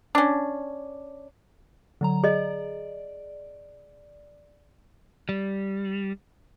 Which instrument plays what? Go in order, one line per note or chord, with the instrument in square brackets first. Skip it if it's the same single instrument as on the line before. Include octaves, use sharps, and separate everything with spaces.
[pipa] C#4 D4
[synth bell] D3 F#3 A#5
[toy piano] G#4 D#5 [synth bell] D5
[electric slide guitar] G3